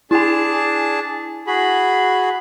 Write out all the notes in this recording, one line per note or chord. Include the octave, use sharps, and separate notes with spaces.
D4 E4 G#4 G#5 A5
F#4 G#4 B5